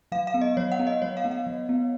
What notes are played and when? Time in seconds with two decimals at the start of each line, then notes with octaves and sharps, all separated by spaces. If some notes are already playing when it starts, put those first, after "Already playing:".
0.12 F#3 F5
0.27 F5
0.34 B3
0.41 D#5
0.57 F#3 C#5
0.72 F#5
0.79 B3
0.87 D#5
1.02 F#3 C#5
1.17 F5
1.25 B3
1.31 F5
1.47 F#3
1.69 B3